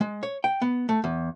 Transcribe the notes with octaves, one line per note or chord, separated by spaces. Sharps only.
G#3
C#5
G5
B3
A3
E2